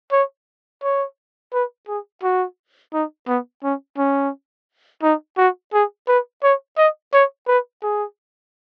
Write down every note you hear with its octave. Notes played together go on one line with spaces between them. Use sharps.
C#5
C#5
B4
G#4
F#4
D#4
B3
C#4
C#4
D#4
F#4
G#4
B4
C#5
D#5
C#5
B4
G#4